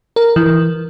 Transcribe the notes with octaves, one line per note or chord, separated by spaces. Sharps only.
A#4
E3